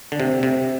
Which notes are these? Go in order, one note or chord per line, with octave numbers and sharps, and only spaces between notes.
D3
C3
C3